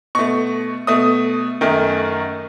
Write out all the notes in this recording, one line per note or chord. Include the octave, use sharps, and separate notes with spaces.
B2 A3 C#6
B2 A3 D#6
F#2 D#3 A3